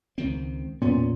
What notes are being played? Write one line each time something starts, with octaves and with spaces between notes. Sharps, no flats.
C#2 D#3 C4
E2 A#2 B3 C#4